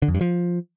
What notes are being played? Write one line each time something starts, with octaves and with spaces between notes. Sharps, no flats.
D3
F2
G2
F3